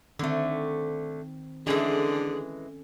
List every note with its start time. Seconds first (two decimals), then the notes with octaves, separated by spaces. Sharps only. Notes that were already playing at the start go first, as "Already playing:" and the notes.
0.19 D3 D#3 A3 C4
1.67 D3 E3 G#3 C#4 G#4 A4